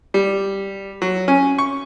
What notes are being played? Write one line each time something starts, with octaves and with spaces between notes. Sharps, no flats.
G3
F#3
C#4
C#6